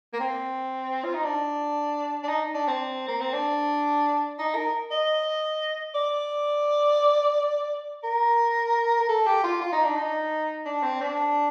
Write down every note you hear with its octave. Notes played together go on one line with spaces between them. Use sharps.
A#3
C4
F4
D#4
D4
D4
D#4
D4
C4
A#3
C4
D4
D#4
A#4
D#5
D5
A#4
A#4
A4
G4
F4
F4
D#4
D4
D#4
D4
C4
D4